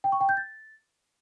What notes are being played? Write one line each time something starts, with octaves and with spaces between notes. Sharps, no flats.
G5
C#6
G5
G6
A6